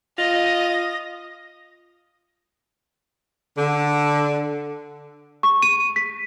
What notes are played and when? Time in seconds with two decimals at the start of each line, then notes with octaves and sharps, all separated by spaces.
0.18 F4 D#5 D#6 A#6
3.58 D3
5.43 C#6
5.62 D#7
5.96 B6